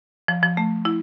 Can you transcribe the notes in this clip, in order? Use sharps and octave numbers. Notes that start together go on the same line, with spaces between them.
F3
F3
A3
E4